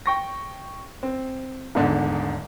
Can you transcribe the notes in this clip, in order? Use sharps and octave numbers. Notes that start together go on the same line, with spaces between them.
G5 C#6 A#6
C4
D#1 E2 G#2 D3